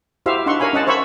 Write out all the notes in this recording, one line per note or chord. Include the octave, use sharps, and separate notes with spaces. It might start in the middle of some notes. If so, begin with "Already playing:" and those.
E4 F#4 G4 C5 E5 F5
D4 D#4 E5 F#5 C6 C#6
A#4 C#5 F5 G#5 B5
C#4 D#5 F#5 A5
C5 C#5 E5 B5 C#6